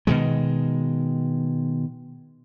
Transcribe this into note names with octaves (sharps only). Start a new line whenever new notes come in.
B2 D#3 G#3